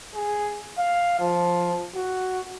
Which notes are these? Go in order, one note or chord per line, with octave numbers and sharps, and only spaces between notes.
G#4
F5
F3
F#4